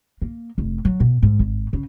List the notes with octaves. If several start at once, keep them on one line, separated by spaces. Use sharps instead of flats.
A#3
F1
F#3
B2
G#2
G#1
C#3